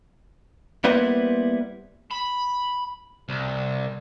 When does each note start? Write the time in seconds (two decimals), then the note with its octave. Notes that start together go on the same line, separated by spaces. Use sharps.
0.84 G3 A#3 B3 E4 B4 C5
2.11 B5
3.29 C2